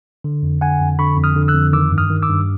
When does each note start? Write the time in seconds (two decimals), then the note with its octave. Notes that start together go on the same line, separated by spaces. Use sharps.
0.24 D3
0.43 F2
0.61 D3 F#5 G#5
0.81 F2
0.98 D3 B5 C#6
1.18 F2
1.24 D#6 F6
1.36 D3
1.48 E6 F#6
1.54 F2
1.73 D#3 D6 E6
1.92 G2
1.98 D#6 F6
2.10 D#3
2.23 D6 E6
2.29 G2